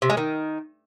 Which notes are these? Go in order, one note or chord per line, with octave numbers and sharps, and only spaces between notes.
C3
G#3
D#3